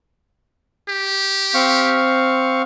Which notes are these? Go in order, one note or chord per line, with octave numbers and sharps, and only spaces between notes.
G4
C4 F5 C#6